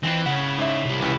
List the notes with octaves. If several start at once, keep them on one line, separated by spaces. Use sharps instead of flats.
F2 E3 C4 E4
C#3 E4 C#5 F#5
G#2 E5
C2 G3
C#2 E3